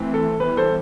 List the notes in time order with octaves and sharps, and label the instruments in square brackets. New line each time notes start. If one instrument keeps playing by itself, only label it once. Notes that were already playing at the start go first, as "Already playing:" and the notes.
Already playing: [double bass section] E3 A3 C4
[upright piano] A4
[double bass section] E3 G3 B3 [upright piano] B4
[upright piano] A4 C5